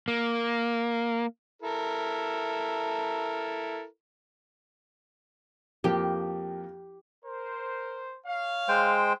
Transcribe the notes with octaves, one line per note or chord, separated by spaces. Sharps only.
A#3
E4 A4 A#4
F2 F3 A#3 G4
A#4 C5
C#5 F5
G#3 C5 G5